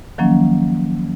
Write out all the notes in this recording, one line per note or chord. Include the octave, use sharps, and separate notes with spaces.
D#3 F3 F#3 A#3 C#4